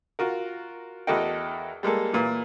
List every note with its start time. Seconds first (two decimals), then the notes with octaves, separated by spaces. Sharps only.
0.19 F4 F#4 A#4
1.07 E2 F#4 A4 A#4 D#5 G5
1.83 G3 G#3 A#3 A4
2.13 A#2 E3